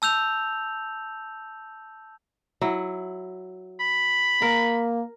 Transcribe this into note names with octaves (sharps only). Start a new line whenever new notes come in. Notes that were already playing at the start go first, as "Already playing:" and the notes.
A5 E6 G6 F7
F#3 E4
B5
A#3 A#4